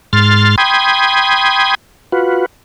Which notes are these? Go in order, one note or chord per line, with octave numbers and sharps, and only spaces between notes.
G#2 C6 F6 A6
G5 B5 C6 D#6 G#6
F4 F#4 B4